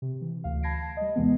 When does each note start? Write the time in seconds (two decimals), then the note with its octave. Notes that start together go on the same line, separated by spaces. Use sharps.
0.02 C3
0.21 E3
0.44 D2 F5
0.63 A5 B5 G#6 A#6 C7 D7
0.97 G3 D#5
1.16 D#2 C3 E3 G#3 B3